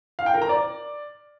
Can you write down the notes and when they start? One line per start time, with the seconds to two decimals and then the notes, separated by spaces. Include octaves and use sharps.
0.19 F5
0.26 G5
0.34 A#4
0.42 A#5
0.49 D5